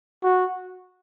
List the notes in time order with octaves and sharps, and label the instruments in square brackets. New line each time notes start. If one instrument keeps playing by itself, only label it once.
[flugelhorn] F#4